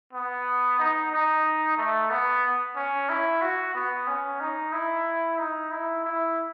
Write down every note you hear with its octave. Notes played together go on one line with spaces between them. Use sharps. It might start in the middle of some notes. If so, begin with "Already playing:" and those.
B3
D#4
D#4
A3
B3
C#4
E4
F#4
B3
C#4
D#4
E4
D#4
E4
E4